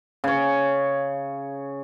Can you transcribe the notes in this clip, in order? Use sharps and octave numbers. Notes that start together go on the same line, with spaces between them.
C#3 C#5